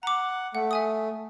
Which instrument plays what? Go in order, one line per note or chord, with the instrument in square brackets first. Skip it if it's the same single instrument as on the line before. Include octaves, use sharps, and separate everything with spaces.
[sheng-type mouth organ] F#5 [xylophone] A#5 D6
[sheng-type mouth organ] A3 [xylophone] F#5
[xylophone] E5 G#5 D#6